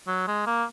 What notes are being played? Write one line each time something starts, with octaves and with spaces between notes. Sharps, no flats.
F#3
G#3
A#3